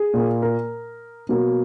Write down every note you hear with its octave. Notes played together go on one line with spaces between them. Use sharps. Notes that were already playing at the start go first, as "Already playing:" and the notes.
Already playing: G#4
A#2 A#3
A#4
B2 F#3 A#3